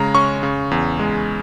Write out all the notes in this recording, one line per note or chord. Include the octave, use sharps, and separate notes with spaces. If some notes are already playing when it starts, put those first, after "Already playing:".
Already playing: C#3 G#3 A#5
C#4 C#6
C#3
E2
G#3